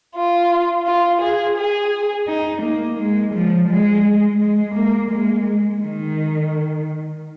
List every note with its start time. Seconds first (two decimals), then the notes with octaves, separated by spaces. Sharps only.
0.14 F4
0.85 F4
1.20 G#4
1.56 G#4
2.27 D#4
2.62 A#3
2.99 G#3
3.34 F3
3.68 G#3
4.40 G#3
4.75 A#3
5.11 G#3
5.82 D#3